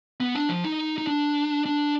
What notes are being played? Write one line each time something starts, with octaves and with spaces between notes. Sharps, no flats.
B3
D4
F3
D#4
D#4
D4
D4